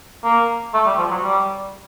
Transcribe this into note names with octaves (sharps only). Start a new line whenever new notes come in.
A#3
A3
G3
F3
F#3
G3